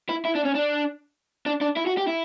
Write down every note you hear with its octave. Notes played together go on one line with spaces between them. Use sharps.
E4
E4
D4
C#4
D4
D4
D4
E4
F#4
G4
E4